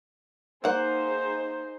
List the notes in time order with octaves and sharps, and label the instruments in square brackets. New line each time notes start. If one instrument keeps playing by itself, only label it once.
[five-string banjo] A#3 F#5 [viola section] D#4 G#4 C5